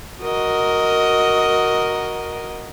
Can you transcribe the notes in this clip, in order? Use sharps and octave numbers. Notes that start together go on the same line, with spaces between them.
F#4 A#4 D#5